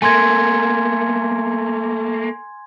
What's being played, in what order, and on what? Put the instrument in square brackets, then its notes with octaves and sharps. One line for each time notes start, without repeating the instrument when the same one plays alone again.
[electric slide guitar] A3 A#3 [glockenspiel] G#5 C6 G#6